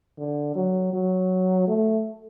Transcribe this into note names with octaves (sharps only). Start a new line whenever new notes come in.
D3
F#3
F#3
A3